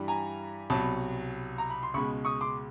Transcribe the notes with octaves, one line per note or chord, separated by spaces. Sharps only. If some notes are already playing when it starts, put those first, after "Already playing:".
Already playing: G2 E3 G3
G#5 A#5
C2 B2 F#3 A5 B5
A#5
B5
C6
C#2 B2 G#3 B5 C#6
C#6 D#6
C6 D6